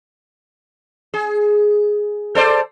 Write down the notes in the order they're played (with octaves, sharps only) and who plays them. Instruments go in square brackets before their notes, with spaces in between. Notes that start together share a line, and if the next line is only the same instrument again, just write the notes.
[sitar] G#4
A4 C5 D5